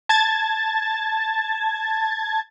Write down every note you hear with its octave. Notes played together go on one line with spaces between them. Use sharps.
A5 G#6 A6